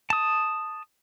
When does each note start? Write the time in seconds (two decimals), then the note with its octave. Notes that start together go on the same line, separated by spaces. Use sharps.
0.10 A5 D#6